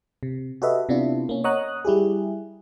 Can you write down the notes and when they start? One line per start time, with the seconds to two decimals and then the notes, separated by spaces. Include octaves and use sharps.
0.23 C3
0.62 F#4 G4 A4 B4 D#5 E5
0.89 C3 B3 D4 E4 F4
1.29 A#3 C#4
1.44 C#5 D#5 F#5 A#5 D#6 F#6
1.85 G3 E4 G4 G#4